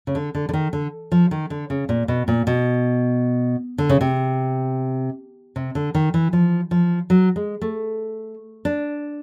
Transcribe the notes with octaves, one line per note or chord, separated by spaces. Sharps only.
C#3
D3
D3
D3
D#3
D3
F3
D#3
D3
C#3
A#2
B2
A#2
B2
D3
C#3
C3
C3
D3
D#3
E3
F3
F3
F#3
G#3
A3
D4